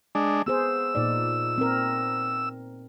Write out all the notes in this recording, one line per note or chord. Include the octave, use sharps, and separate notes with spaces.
G#3 D4
B3 G#4 C5 E6
A#2 D#4 D5
C4 A#4